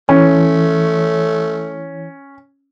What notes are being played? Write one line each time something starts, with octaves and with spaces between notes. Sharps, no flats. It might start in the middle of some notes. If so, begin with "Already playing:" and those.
E3 A3 C#4 C#5